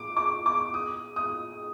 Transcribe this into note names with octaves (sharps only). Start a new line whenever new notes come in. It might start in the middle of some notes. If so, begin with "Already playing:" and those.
Already playing: D6
D6
D6
D#6
D#6